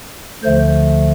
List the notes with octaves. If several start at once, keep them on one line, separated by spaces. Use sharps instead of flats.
D2 D3 F3 A3 C5